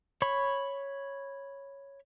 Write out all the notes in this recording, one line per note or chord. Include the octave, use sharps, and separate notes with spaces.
C#5 B5 C#6